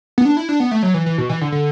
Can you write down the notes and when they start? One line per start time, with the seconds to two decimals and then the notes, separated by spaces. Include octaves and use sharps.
0.18 B3
0.25 D4
0.37 E4
0.49 D4
0.60 B3
0.71 A3
0.83 F#3
0.94 E3
1.06 E3
1.18 B2
1.29 E3
1.41 D3
1.52 D3